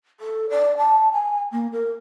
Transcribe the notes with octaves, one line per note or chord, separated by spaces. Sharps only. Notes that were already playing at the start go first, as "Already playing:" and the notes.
A4
D5
A5
G#5
A#3
A#4